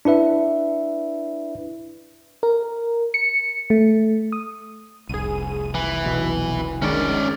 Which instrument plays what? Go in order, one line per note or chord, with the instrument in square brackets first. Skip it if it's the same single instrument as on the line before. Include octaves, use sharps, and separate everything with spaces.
[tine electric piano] D4 E4 B4 E5
[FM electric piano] A#4
C#7
A3
D#6
[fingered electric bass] F1 C2 [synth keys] G#4 D#7
[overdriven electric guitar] E3
[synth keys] B1 B2
[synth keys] D#3 G#3 D4 [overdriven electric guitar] C#4 D5